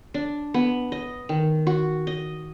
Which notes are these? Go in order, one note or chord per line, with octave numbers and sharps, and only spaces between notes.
D4
B3
D#5
D#3
F#4
D#5